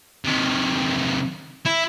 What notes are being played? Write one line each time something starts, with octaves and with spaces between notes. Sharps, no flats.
C3 D#3
E4